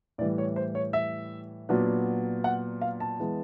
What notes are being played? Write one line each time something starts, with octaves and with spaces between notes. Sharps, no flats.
A2 E3 G3 D5
C#5
C5
C#5
E5
A#2 F#3 B3 D4
F#5
F5
A5
E3 G#3 B3